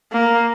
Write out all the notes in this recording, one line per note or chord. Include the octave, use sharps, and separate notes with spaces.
A#3